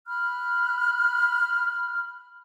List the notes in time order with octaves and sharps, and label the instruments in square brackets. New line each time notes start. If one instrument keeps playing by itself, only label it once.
[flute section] B5 F6 F#6